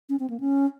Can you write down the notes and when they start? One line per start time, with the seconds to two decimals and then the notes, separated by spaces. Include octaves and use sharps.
0.09 C#4
0.20 C4
0.30 A#3
0.40 C#4